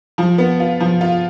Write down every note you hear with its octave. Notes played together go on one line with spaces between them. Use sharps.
F3
B3
F4
F3
F4